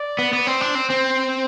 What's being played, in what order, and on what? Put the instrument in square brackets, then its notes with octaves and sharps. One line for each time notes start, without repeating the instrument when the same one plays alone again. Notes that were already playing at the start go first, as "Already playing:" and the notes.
Already playing: [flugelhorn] D5
[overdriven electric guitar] B3
B3
[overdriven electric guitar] C4 [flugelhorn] C5
[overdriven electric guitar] D4
C4
C4